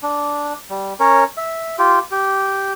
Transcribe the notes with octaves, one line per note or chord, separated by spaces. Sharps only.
D4
G3
C#4 A#4 C#5
E5
F4 G4
G4